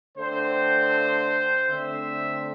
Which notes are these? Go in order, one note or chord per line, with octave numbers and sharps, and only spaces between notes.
D3 A3 C4 C5
D3 A3 C4 E5